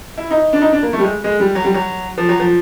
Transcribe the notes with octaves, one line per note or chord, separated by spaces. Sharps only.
E4
D#4
D4
D#4
D4
A#3
A3
G3
G#3
G#3
G3
F#3
G3
F#3
F3
F#3
F3